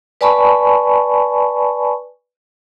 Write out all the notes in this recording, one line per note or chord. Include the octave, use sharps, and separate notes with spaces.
B4 D5 G#5 A5 B5 C#6